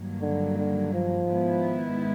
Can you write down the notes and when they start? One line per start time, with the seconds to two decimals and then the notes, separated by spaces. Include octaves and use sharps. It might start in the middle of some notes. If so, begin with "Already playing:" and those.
Already playing: G2 D#3 F#3 A#3
0.21 D3
0.57 D3
0.93 F3
1.29 G#2 D#3 G#3 B3 E4